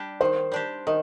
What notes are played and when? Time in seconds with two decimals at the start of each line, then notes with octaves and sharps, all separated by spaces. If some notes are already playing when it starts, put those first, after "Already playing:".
Already playing: G3 D4 G4
0.21 D#3 C5
0.52 G3 D4 G4
0.87 D#3 D#5